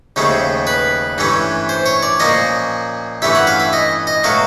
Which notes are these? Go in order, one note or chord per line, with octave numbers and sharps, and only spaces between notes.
D#2 C#3 F3 A3 C#4
B4
G2 E3 A3 C#4
C5
C#5
D5
A#2 F3 A#3 C#4 D#5
G2 E3 A3 C#4 E5
F#5
F5
E5
D#5
D#5
B2 F#3 A3 F5